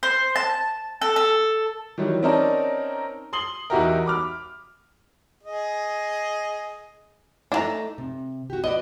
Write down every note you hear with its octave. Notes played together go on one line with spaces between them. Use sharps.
C5
A5
A4
A4
D#3 E3 F#3 G3
C4 C#4 D#4 A#4 D5 A5
C6 D#6 C7 F#7 G7
E2 D#4 E4 F#4 G4 A#4
B5 D6 F6
G#4 D#5
A3 D4 D#4 E5 A5 A#5
C3
F#4 G4
B3 F#4 D5 D#5